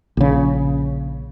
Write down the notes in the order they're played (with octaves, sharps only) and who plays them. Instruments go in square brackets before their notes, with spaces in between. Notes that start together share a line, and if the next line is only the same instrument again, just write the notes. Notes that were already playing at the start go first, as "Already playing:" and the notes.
[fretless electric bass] A#1 C#3